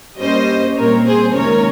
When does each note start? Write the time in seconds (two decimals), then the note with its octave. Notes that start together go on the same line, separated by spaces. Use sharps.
0.20 G2 G3 A#3 C#4 C5 D#5
0.77 A#2 G3 C4 A#4 C#5
1.05 G#4 C5
1.33 C#2 C3 D#3 A#3 C#4 A#4 C#5